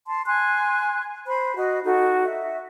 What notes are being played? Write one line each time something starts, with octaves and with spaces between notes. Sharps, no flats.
A5 C6
G#5 C6 F#6
C5 B5
F#4 D#5
D#4 F#4 A4
E5